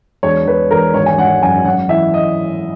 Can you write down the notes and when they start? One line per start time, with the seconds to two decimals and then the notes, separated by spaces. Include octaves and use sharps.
0.23 E1 C#5
0.46 E1 B4
0.71 E1 A#4
0.94 G#1 C#5
1.06 G#5
1.18 G#1 F#5
1.42 F#2 G#5
1.65 F#2 F#5
1.89 E3 E5
2.14 D#5